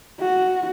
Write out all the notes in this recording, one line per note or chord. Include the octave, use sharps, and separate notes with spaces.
F#4